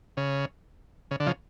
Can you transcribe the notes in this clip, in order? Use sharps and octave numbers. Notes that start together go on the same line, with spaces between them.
C#3
C#3
D3
C#3 F3